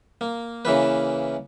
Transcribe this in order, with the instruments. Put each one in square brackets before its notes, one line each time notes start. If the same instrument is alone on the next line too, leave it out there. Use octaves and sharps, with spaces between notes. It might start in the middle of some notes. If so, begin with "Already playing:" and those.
[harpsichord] A#3
C#3 E3 A#3 B4